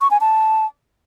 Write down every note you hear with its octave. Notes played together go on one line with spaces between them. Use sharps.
C#6
G#5
A5